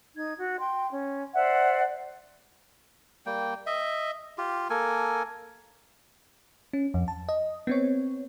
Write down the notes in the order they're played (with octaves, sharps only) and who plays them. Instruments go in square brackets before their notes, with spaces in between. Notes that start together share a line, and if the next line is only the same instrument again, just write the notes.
[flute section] D#4 G#6
F#4
G5 C6
C#4
C5 D5 E5 F#5
[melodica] G3 A#3 G5
D#5 E5
F4 G4
A#3 A4 A#4 G#5
[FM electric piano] C#4
F2
A5
D#5
B3 C4 C#5